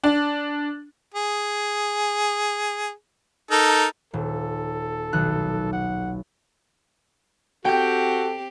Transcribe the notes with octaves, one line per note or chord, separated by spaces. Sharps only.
D4
G#4
D#4 A4 A#4
D#1 A4
B1 D#3 F#6
F#5
C4 F#4 G4 A4 G5 G6